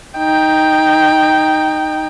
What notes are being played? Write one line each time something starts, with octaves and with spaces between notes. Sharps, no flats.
D#4 G5